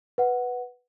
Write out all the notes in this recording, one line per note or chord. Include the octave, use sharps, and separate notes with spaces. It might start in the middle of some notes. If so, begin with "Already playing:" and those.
B4 F#5